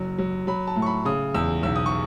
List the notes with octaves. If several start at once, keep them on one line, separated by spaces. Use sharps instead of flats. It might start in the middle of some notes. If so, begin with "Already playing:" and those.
Already playing: F#1 F#3
F#3
F#3 B5
A5
A2
C#6
B5
C#3 D#6
E2 E6
B1 E6
D#6
C#6